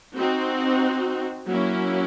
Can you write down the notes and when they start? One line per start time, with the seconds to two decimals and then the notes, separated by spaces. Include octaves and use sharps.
0.15 C4 D#4 F#4
1.48 F#3 A#3 C#4 E4